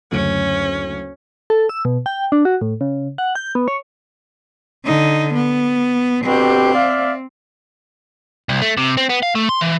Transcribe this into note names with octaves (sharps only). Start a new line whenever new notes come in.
F#1 D2 C#4
A4
E6
B2
G5
D4
F#4
A2
C#3
F#5
G6
B3
C#5
D3 D#4
B3
B2 D3 C4 G4
D5 E5 F5
C2
A3
C3
C4
B3
F5
A3
C6
E3